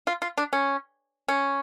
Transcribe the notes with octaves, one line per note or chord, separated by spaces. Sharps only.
F4
F4
D4
C#4
C#4